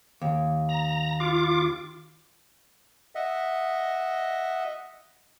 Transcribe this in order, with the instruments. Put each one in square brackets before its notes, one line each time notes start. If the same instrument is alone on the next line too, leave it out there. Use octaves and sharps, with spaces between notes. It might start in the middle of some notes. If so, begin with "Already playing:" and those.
[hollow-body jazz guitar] D#2
[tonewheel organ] A#5
F4 D6
[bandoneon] D#5 E5 F#5